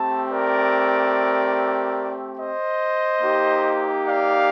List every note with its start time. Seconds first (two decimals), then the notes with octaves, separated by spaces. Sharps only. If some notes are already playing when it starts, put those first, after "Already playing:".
Already playing: A3 C4 G4 A5
0.29 A#4 D5
2.38 C5 D#5
3.21 A#3 D#4 G4
4.05 D5 F5